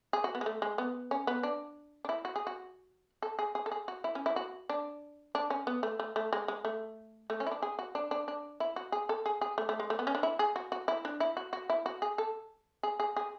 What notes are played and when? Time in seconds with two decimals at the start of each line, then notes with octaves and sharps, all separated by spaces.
0.13 G#4
0.24 F#4
0.35 B3
0.41 G#3
0.46 A3
0.62 G#3
0.78 B3
1.11 C#4
1.27 B3
1.43 D4
2.05 D4
2.09 E4
2.25 F#4
2.36 G#4
2.47 F#4
3.22 A4
3.39 G#4
3.55 G#4
3.66 A4
3.72 G#4
3.88 F#4
4.04 E4
4.15 C#4
4.26 E4
4.36 F#4
4.69 D4
5.35 D4
5.50 C#4
5.67 B3
5.83 A3
6.00 A3
6.16 A3
6.33 G#3
6.48 G#3
6.65 A3
7.30 A3
7.40 C#4
7.47 E4
7.51 D4
7.62 G#4
7.79 F#4
7.95 D4
8.11 D4
8.28 D4
8.60 E4
8.76 F#4
8.92 G#4
9.09 A4
9.26 G#4
9.41 G#4
9.58 A3
9.69 A3
9.80 G#3
9.90 A3
9.99 B3
10.07 C#4
10.15 D4
10.23 E4
10.39 G#4
10.56 F#4
10.72 F#4
10.88 E4
11.05 D4
11.20 E4
11.37 F#4
11.53 F#4
11.70 E4
11.86 F#4
12.02 G#4
12.18 A4
12.83 G#4
13.00 G#4
13.16 G#4